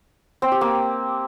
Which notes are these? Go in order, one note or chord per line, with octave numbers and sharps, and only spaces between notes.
C4
G4
A#3